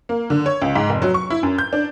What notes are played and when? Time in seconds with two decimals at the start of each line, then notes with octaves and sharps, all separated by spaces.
0.09 A#3
0.30 D3
0.46 C#5
0.62 C#2
0.76 G#2
0.89 F1
1.02 F#3
1.14 C#6
1.30 E4
1.43 F#2
1.58 G6
1.73 D4